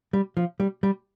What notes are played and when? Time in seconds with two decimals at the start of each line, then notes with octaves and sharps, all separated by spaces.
0.13 G3
0.37 F3
0.60 G3
0.83 G3